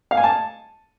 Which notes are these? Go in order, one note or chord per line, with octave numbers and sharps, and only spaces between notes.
F5
G#5
A5